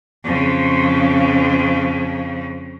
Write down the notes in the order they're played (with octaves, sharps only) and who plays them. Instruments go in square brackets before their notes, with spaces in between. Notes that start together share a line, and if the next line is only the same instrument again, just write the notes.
[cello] F2 C#3